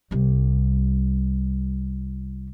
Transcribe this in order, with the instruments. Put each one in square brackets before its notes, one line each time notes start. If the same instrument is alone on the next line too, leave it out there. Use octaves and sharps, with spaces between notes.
[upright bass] C2 G3